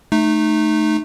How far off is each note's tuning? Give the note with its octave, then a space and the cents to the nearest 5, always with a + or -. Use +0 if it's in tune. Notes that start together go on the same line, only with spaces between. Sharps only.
A3 -10 D#4 -20